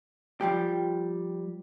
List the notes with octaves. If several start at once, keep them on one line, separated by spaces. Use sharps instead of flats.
F3 G3 G4